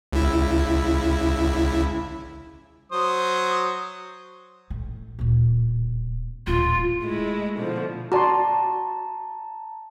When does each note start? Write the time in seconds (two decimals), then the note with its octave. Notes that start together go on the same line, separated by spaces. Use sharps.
0.13 C#2 E4
2.92 F#3 C5 D#6
4.70 A1 A3
5.19 D1 A#2
6.47 D1 A1 F4
7.02 G#3 A3 E4
7.58 B2 D3 F3
8.12 F#4 D5 A5 A#5 C6